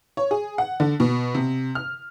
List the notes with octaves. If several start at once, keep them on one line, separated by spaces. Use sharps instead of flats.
C#5
G#4
F#5
D3
B2
C3
F6